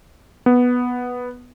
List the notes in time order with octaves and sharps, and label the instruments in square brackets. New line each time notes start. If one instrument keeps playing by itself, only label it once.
[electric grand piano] B3